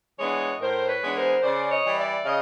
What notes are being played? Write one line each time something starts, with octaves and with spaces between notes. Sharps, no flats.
E3 G#3 B3 D4 C#5 D#5
A2 A#4 C5
B4 C#5
E3 G#3 B3 D4
A#4 C5
C#3 C5 D5
C#5 D#5
E3 G3
D5 E5
C#3 D#5 F5